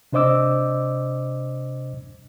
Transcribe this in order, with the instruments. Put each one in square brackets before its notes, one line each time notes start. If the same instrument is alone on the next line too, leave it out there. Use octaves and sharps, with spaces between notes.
[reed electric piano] C3 D4 C5 D#5 D6 E6